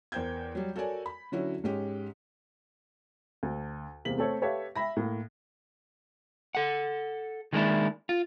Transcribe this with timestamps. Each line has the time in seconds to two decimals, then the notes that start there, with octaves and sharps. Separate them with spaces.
0.12 E2 A#4 C5 G5 G6 G#6
0.55 F#3 G3
0.76 F#4 A4 A#4 C#5 D5 G#5
1.06 B5
1.32 D3 F#3 C#4 E4 F#4
1.64 G#2 G#3 C#4 G4
3.43 D2
4.05 E2 C3 A#3 B6 F#7
4.18 A3 C4 A4 C#5
4.42 G4 A4 B4 C#5 E5 F5
4.76 E5 B5 A#6
4.97 A2 A#3
6.55 A4 F#5
7.53 D#3 G#3 A#3 C#4 D4 E4
8.09 F4